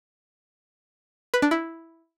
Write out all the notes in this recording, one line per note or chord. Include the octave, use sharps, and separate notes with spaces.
B4
D4
E4